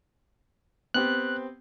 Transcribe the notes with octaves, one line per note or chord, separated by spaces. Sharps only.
B3 C4 G4 F#6